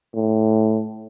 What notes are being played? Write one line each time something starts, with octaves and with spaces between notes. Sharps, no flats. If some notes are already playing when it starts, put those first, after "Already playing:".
A2